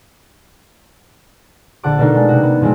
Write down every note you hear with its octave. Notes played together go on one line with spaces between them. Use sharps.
A#1 D3 F#5 A5 D6
B2 A3 D4 D#4 A4 A#4
G#3
C3 F#4
B3
A#2 F3 G#3 A3 C4